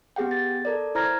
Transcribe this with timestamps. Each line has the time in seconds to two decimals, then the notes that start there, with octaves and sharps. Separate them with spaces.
0.16 B3 G4 G#4 F#5 G5
0.31 A6
0.65 A4 A#4 D5
0.95 E4 C5 A#5 F6 G#6 A#6